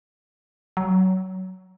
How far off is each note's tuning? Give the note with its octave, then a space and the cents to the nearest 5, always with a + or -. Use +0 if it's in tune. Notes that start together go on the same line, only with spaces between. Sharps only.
F#3 +20